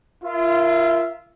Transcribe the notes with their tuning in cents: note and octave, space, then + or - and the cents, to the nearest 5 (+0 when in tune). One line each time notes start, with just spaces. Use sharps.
F4 -25 A#4 +0 E5 +0